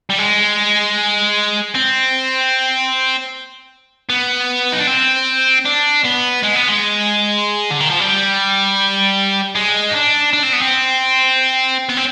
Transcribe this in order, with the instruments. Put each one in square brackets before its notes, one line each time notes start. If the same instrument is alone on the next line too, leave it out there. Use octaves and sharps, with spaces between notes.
[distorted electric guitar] G3
G#3
C4
B3
D#4
D4
C4
D4
B3
G#3
B3
G#3
D3
D#3
F3
G3
G#3
D#4
D4
D4
C4
B3
C4
B3
C4